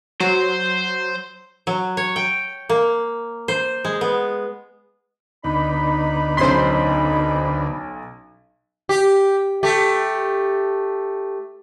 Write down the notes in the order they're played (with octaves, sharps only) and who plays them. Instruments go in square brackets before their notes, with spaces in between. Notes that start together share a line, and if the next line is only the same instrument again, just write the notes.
[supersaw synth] F#3 [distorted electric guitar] C5
[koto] F#3
C#5
G5
A#3
C5
G#3
B3
[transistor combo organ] D2 D3 B3 [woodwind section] D#4 B5
[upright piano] B1 C#4 B6 [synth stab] C5 C6
[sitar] G4
A3 G4